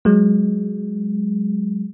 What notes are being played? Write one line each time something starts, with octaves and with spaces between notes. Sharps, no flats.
F#3 G#3